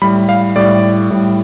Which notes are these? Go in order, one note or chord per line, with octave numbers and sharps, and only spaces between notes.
A2 G3 B5
F5
A2 G3 D5
A2 G3